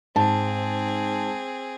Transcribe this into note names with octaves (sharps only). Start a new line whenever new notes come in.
G#2 C4 G#4 A5